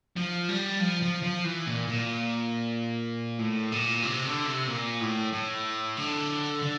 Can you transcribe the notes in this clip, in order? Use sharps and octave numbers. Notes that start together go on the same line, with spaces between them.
F3
G3
F3
F3
F3
E3
A#2
A#2
A2
A#2
C3
D3
C3
A#2
A2
A2
D3
D3